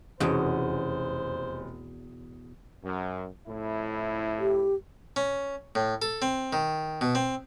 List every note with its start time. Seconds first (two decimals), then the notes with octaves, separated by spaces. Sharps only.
0.20 F1 E2 B2 C#4 C5 D#6
2.85 F#2
3.47 F2 A2 E4
4.39 G4
5.16 C#4
5.75 A2
6.02 A4
6.22 C4
6.53 D#3
7.01 B2
7.15 C4